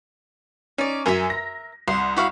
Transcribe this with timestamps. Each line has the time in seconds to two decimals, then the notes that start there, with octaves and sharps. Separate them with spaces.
0.78 C#4 D#4 D5
1.06 F#2 A#4 E5 G#5
1.30 A#6
1.88 C2 C6
2.17 E4 F#4 F5